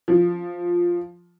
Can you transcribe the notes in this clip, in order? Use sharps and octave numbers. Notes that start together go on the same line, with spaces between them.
F3